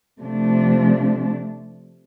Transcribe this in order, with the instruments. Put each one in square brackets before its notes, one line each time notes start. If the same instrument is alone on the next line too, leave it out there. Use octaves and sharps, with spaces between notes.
[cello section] C3 F3 A3 D4